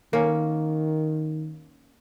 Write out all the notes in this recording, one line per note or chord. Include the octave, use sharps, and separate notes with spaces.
D#3 A#3 C#4